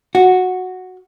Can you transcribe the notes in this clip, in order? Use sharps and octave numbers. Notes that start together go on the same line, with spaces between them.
F#4